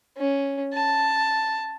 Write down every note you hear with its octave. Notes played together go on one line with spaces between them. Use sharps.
C#4
A5